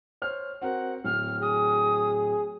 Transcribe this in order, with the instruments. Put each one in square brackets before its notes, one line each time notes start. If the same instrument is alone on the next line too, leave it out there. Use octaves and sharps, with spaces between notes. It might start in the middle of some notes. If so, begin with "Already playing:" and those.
[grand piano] C5 C#5 F6
[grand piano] C4 F#4 A#4 [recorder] F#5
[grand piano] D1 [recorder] F6
[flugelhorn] G#4 [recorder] D#6